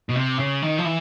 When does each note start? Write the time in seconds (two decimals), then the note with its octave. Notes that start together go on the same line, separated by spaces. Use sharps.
0.09 B2
0.16 C3
0.39 C#3
0.62 D#3
0.78 F3
0.85 E3